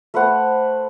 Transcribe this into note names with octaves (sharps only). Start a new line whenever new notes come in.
A3 B4 C5 F#5